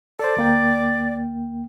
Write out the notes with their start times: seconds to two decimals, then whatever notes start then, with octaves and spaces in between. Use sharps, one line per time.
0.19 A4 C5 D5
0.37 D2 A#3 G5